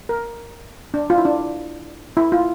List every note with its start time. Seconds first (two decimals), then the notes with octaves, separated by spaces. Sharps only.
0.09 A#4
0.94 D4
1.10 F4
1.18 E4
1.25 D4
2.17 E4
2.32 F4